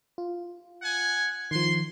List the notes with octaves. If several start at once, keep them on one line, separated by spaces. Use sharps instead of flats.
F4
F#5 G#5
D#3 F3 C6